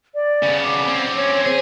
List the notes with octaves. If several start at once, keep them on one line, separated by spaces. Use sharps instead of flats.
D5
C#3 B3
D6
C4 C#4
C#5
G#4 C5